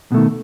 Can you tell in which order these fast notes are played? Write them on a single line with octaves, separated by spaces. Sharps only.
B2 A3 D#3